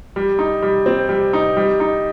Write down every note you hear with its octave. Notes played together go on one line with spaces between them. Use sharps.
G3
D#4
G3
C4
G3
D#4
G3
D#4